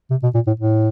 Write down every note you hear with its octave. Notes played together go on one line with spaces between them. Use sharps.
C3
B2
A#2
A2
A2